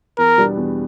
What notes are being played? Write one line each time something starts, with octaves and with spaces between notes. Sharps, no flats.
E2 A#4
B2 G3 B3 D4
E2